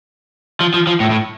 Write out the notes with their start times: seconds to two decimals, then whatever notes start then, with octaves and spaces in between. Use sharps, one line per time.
0.61 F3
0.74 F3
0.87 F3
1.00 A2
1.10 A2